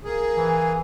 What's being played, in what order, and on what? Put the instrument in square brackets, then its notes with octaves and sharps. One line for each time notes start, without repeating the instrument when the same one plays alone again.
[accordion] A#3 G#4
[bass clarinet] E3